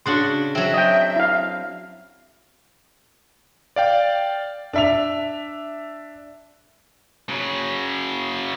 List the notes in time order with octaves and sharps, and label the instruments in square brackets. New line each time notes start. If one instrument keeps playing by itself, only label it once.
[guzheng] C#3 D4 F#4 [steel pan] C6 C#6
[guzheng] F#3 C4 [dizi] E5
[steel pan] D#5 G5
E4 F5
[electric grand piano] D5 F5 G5
[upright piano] D4 E5 F7
[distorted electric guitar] C#3 F#3